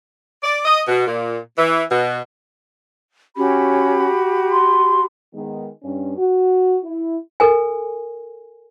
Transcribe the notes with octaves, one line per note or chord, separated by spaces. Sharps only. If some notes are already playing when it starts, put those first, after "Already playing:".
D5
D#5
B2
A#2
E3
B2
C#4 F#4 G4 B5
C6
D#3 G#3 B3
G2 C#4
F#4
E4
A4 A#4 G#5